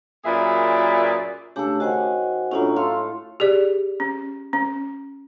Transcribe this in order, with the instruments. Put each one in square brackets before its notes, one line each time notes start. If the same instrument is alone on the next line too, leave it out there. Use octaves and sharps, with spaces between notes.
[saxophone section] F#2 A#2 G#4 B4 D5 E5
[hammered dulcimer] C#3 A4 [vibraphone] A3 D4 G4
[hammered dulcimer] D#3 G#5 [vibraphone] F#4 C5 F#5
[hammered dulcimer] A2 F#3 [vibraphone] C#4 D4 F4
[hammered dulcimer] F4 A4 [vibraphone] F5 C6
[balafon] G4 G#4 D5
C#4
C#4